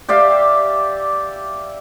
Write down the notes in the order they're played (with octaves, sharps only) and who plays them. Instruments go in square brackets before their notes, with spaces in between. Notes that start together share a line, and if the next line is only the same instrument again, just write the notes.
[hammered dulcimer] G4 D5 E5 F5